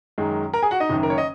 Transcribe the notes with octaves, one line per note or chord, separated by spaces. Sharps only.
F#2 D#3 G#3
A#4 A#5
G#4 G#5
F#4 F#5
D#4 D#5
F#1 F#2 D#3
A#4
C#5
D#5